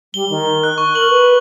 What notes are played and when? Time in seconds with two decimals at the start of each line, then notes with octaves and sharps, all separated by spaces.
0.14 G3 G7
0.30 D#3
0.64 F#6
0.78 C#6
0.95 A#4 F#7
1.10 B4